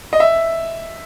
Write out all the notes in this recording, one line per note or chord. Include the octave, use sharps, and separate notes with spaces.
D#5
E5